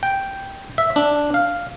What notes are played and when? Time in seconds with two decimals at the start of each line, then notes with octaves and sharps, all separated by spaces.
0.03 G5
0.78 E5
0.96 D4
1.34 F5